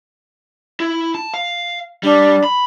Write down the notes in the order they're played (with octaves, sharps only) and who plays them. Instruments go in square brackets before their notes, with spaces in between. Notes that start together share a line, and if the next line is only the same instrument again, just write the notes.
[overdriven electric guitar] E4
A5
F5
[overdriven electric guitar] G3 [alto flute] D4
[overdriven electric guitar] B5